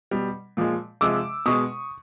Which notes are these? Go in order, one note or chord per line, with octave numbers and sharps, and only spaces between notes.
B2 G3
A#2 F3 G#3
C3 F3 G#3 D6 E6
B2 G#3 C#6 D#6